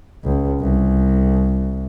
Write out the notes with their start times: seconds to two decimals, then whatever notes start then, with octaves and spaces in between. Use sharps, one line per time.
0.24 C#2
0.60 C2